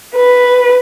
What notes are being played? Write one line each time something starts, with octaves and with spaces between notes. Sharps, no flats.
B4